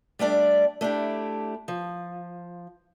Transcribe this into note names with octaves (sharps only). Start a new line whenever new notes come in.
G3 A3 D4 D5
A3 D4 E4 G4
F3